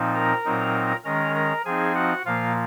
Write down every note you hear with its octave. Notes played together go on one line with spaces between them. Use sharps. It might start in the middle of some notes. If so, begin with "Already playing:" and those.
Already playing: A#2 F3 C4 D#4
A#4 A#5
A#2 F#3 C4 D#4
D#3 G#3 C#4 A#4 A#5
A#4 A#5
F3 C4 D#4 G#4 G#5
F#4 F#5
A#2 F3 A#3 F4 F5